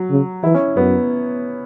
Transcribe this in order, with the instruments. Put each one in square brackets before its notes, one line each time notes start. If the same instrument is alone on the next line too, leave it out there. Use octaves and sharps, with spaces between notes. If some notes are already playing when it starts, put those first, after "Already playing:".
Already playing: [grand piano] F#3
[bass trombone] C#3
[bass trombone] E3 [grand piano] E4
[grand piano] C#4
[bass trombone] F#2 [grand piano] B3